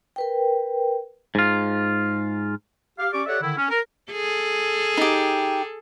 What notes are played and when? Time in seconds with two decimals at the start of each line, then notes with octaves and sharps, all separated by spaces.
0.16 A#4 B4 G5
1.35 G#2 F4
2.99 G4 F5
3.12 C#4 G4 D5 C#6 D6
3.26 G4 A4 C#5 D5 E5 F#5
3.41 D3 D#3 E4
3.57 C#4
3.69 A#4
4.12 G#4 A4
4.97 D#4 G4